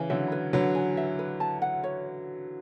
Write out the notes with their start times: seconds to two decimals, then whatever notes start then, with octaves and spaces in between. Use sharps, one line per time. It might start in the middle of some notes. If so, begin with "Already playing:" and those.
Already playing: C#3 E3 G#5
0.10 D3 F#3 E5
0.32 B4
0.53 D3 F#3 B4
0.75 G#5
0.97 E5
1.19 B4
1.40 A5
1.62 F#5
1.84 C#5